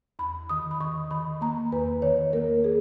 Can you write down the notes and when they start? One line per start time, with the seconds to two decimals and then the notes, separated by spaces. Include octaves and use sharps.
0.19 E2 B5
0.49 D#3 D#6
0.71 B5
0.80 D#3 C#6
1.11 D#3 B5
1.41 A#3 A#5
1.72 E2 B4
2.02 D#3 C#5
2.33 A#3 A#4
2.64 G#4